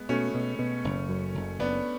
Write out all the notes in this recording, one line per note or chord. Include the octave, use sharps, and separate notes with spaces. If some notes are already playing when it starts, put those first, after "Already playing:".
Already playing: G#3 B3
B2 A3 C#4
B2
B2
F#1
F#2
F#1
F#1 B3 D4